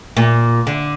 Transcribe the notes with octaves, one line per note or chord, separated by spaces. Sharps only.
A#2
D3